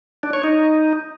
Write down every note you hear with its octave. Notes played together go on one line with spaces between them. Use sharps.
D4
C#5
D#4